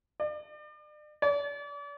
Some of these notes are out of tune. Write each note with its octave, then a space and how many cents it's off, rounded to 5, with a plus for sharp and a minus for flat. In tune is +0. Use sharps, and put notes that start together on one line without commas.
D5 +40
D5 -40